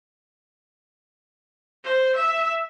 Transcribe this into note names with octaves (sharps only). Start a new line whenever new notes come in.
C5
E5